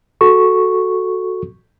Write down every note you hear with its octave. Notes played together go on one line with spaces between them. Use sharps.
F#4 A4 C#6